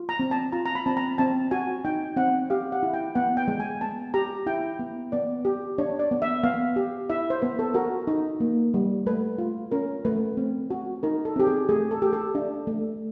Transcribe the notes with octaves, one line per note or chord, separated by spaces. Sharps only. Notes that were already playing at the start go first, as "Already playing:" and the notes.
Already playing: F4
A#5
C4
A5
F4 A#5
A#5
B5
C4 A5
A#5
C4 A5
F#4 G#5
D#4 G5
C4 F#5
G4 F5
F#5
E4
G5
B3 F#5
G5
G#3
G#5
B3 A5
G4 A#5
E4 G5
B3
B3 D5
G4
D4 C#5
D5
B3
E5
B3 F5
G4
E4 E5
C5
B3 B4
A4
F#4 A#4
D#4
A#3
G3
A3 B4
F4
C#4 A#4
A3 B4
C4
F#4
D#4 A#4
A4
C4 G4
G#4
A3 G#4
A4
G4
A4
D4
A3